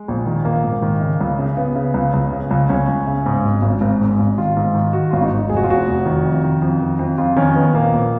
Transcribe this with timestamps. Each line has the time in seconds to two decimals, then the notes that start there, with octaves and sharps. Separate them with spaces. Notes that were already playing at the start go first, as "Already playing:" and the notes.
Already playing: G#3
0.08 A#1
0.26 D#3
0.45 A#1 A#3
0.64 G#2
0.82 D#3
1.01 C#3
1.21 C#2
1.39 C#3
1.57 C#3 B3
1.75 C#3
1.94 C#2
2.13 C#2
2.32 C#3
2.51 C#2
2.69 C#2 C#4
2.88 C#2
3.07 C#3
3.26 G#2
3.45 G#1
3.62 G#1
3.81 G#1
4.01 G#2
4.19 G#1
4.38 D#3 F4
4.57 G#2
4.74 D#3
4.93 D#3 F#4
5.11 G#1 F4
5.22 D#4
5.31 G#1
5.49 F1 G#4
5.57 F#4
5.64 F4
5.69 F1 F#4
5.88 F1
6.06 D#3
6.25 F2
6.44 D#3
6.62 F2
6.81 D#3
6.99 F2
7.18 F2 F4
7.36 D#3 C#4
7.56 D#3 B3
7.74 A#1 A#3
7.93 A#1